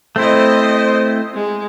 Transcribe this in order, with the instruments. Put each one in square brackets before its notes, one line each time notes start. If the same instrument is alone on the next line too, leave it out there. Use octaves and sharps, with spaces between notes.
[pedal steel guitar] A3 C4 E4 [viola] C5 D#5
[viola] G#3